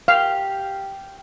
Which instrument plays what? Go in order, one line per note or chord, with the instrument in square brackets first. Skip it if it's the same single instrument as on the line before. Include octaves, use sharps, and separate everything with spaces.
[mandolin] G4 [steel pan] F5